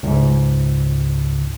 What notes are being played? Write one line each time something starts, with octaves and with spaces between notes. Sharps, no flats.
C#2 G#2